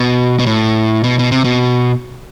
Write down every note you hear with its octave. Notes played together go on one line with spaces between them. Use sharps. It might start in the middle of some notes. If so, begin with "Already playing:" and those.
Already playing: B2
B2
A2
B2
B2
C3
B2